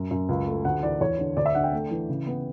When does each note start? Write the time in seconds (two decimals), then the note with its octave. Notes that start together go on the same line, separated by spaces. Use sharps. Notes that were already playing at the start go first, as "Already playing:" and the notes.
Already playing: F#2
0.11 F#2
0.29 C#2
0.47 A3
0.65 D2 F#5
0.83 E3 D5
1.00 E2 C#5
1.19 D3
1.37 D2 D5
1.46 E5
1.55 D3 F#5
1.64 G5
1.73 A3
1.91 E3
2.09 C#3
2.26 B3